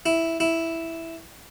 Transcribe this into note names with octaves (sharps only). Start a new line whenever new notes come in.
E4
E4